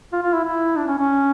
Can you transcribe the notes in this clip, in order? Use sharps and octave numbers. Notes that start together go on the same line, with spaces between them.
F4
F4
E4
E4
D4
C#4
C#4